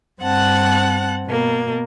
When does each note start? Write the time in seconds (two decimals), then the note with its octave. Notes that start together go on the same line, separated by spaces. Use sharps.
0.21 G2 C4 F#5 A5 F#6
1.26 B2 A#3